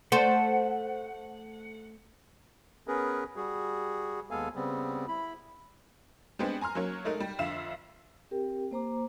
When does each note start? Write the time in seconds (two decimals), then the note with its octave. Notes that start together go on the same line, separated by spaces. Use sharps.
0.12 A3 C5 F#5
2.88 B3 C#4 G#4 A#4 B4
3.36 G3 F#4 G#4
4.31 D#2 G#3 B3 A4 F5 G#5
4.55 C#3 G3 B3 C4
5.08 E4 B5
6.39 G3 G#3 B3 C4 D4
6.61 G#5 A#5 C6 F6
6.75 F#3 A#3 C#4 C#5
7.05 G#3 A3 D#4 A#4
7.20 G3
7.39 F2 D3 E5 F5 E7
8.31 C4 G4 A#4 G5
8.71 A#3 C5 A#5 D6